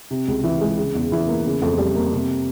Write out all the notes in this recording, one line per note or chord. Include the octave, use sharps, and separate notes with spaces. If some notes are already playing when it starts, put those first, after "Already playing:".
C3
C#2
E3
G#3
C#3
E2
E3
A#3
C#3
F2
G3
A#3
C3